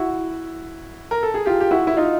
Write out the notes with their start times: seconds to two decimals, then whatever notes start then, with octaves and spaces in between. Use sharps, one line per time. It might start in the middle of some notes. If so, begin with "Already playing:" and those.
Already playing: E4 F#4
1.11 A#4
1.23 A4
1.34 G#4
1.46 F4 G4
1.61 G4
1.71 E4 F#4
1.87 E4
1.97 D#4 F4